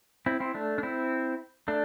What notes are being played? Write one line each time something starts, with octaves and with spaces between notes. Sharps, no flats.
C4 E4
C4 E4
A3 D4
D4
C4 E4
A3 D4